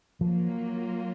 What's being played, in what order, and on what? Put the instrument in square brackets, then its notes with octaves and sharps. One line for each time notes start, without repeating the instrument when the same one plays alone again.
[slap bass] F3 [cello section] F#3 A#3 F4